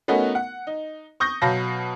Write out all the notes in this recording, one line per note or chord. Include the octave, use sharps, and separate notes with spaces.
A3 B3 C#4 D#4 F#4 A#4
F#5
D#4
C#6 D#6 G6 A#6
B2 F#3 F5 A5 B5 A#6